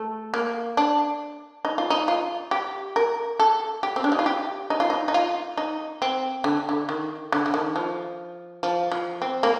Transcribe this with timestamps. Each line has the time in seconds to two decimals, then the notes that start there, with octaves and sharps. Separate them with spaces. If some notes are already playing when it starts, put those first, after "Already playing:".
Already playing: A3
0.34 A#3
0.77 D4
1.65 D#4
1.78 F4
1.90 D#4
2.08 F4
2.51 G4
2.96 A#4
3.39 A4
3.83 G4
3.96 C4
4.04 D4
4.12 D#4
4.19 F4
4.26 G4
4.70 D#4
4.80 F4
4.90 D#4
5.08 D#4
5.14 F4
5.57 D#4
6.02 C4
6.44 D3
6.69 D3
6.89 D#3
7.32 D3
7.46 D3
7.54 D#3
7.76 F3
8.63 F3
8.92 F3
9.22 C4
9.43 A#3